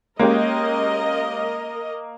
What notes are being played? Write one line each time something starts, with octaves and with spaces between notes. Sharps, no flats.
G#3 A#3 C#4 G4 A#4 D#5